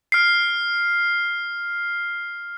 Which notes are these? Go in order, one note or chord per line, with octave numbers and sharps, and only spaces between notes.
F6 C7